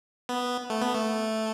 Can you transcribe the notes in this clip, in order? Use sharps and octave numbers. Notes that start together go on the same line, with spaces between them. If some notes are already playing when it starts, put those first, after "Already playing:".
B3
A3
B3
A3